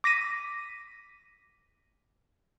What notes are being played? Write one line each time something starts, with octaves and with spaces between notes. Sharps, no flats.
D6 A#6 B6 D#7